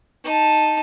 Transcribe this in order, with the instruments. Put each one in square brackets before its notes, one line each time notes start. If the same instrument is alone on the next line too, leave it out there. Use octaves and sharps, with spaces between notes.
[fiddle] D#4 A5